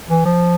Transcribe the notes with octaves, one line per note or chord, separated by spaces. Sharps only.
E3
F3